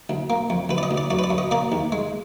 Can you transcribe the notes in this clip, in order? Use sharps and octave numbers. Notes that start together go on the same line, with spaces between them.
D2
A#3
F2
D2 B4
D5
D#5
D2
D5
F#2 D5
B4
D5
F#2
D#5
A#3 D5
D#2
G#3